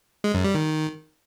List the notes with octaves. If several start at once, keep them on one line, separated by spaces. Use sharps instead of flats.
G#3
F#2
G3
D#3